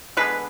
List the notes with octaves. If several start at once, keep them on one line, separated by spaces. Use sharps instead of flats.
D3 G#3 B3 B4